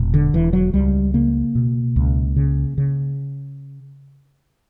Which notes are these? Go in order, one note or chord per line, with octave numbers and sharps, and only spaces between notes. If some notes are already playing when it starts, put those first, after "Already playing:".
Already playing: E1 A#2
D3
E1 E3
F#3
C#2 G3
C#3 A#3
B2
C#2
C#3
C#3